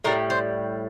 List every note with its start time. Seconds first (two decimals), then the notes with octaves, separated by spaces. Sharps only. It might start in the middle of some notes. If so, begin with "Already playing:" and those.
0.04 A2 G3 A#4
0.30 C5